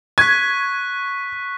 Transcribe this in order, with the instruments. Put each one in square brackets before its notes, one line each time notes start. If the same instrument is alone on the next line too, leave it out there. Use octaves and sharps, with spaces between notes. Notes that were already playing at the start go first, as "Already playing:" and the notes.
[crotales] C#6 F#6 B6 [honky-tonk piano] G#6